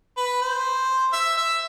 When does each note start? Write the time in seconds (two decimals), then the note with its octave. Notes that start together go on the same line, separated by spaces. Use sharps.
0.17 B4
0.42 C5
1.13 E5
1.37 E5